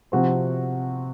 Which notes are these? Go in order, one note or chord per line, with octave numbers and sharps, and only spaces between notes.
C3 F3 C4 F#4 C5